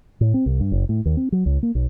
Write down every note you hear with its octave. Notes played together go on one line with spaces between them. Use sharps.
A2
C4
C2
G2
F#1
A2
D#2
C4
F#3
C#2
A#3
B1